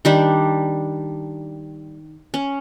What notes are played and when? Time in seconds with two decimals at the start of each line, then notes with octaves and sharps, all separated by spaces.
0.05 D#3 G3 D4
2.34 C#4